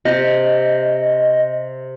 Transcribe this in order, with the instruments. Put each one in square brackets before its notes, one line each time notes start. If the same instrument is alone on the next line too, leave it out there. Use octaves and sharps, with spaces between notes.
[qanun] C3 [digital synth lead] D#5